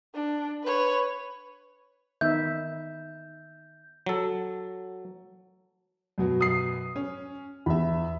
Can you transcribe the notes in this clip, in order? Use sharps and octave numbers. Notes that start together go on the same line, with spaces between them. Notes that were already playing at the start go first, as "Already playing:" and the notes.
D4
B4 C#5
D#3 B3 D#4 E5 G6
F#3 A4
F#2 B2 F#3
D#6 C7
C#4
E2 E5 B5